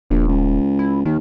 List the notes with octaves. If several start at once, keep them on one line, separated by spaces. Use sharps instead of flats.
D#1 A#1
C#2
E4
D#2 D#3